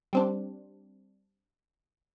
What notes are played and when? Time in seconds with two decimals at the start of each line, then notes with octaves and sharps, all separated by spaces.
0.13 G3 C4 D4